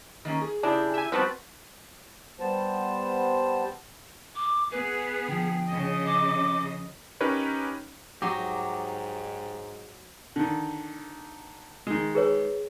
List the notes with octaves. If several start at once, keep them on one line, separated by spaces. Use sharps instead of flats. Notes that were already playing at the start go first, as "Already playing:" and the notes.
D#3 A#3 C#4
G#4
C#3 D4 E4 G4 G#4
E5 G#5
F3 G3 B3 C4 F#4 B4 C5 A5
G3 B3 C5 A5
D6
B3 G#4 B4
D3 F3 G5
C#3 D#5
D6
C#4 D#4 G4 A#4 B4 C#5
G#2 F#3 G4 D#5 C6
D3 D#3
D#3 G#3
G#4 B4 C#5